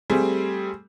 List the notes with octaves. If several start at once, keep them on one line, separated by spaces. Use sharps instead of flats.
G3 A3 C4 G#4